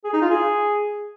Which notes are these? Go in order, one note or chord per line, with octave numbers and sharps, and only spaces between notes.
G#4
D#4
F4
G#4